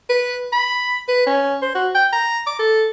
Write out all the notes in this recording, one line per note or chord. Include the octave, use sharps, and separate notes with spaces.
B4
B5
B4
C#4
C5
F#4
G5
A#5
D6
A4